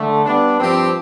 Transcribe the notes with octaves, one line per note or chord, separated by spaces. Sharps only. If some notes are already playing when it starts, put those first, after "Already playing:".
Already playing: D3 A3
G3 B3 D4
G2 F3 C4 G4